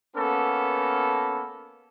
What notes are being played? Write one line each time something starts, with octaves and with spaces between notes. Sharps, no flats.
A#3 B3 C#4 A4